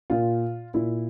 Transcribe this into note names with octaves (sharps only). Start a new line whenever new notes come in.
A#2 F4
A#2 E4